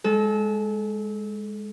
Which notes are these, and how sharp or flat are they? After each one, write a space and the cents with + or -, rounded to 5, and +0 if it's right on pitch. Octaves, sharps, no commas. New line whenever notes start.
G#3 -5 A4 -30